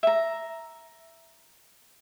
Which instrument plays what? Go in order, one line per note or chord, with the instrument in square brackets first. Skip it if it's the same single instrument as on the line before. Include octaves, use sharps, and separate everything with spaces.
[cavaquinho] E5 A#5